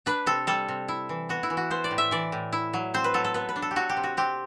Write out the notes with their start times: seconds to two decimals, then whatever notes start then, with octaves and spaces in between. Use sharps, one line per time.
0.06 D4 B4
0.26 C3 A4
0.47 G3 A4
0.68 C3
0.88 E4
1.09 E3
1.29 B3 F#4
1.43 E4
1.50 E3
1.57 F#4
1.71 B3 C5
1.84 D5
1.91 A2
1.98 E5
2.11 E3 D5
2.32 A2
2.53 E4
2.74 F#3
2.94 C4 C5
3.04 B4
3.14 F#3 A4
3.24 A4
3.34 B3 B4
3.49 B4
3.56 D4
3.62 A4
3.71 G4
3.76 F#3 F#4
3.89 G4
3.97 C3
4.04 F#4
4.17 C4 G4